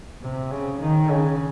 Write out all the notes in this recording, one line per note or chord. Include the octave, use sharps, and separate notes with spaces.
C3
C#3
D#3
C#3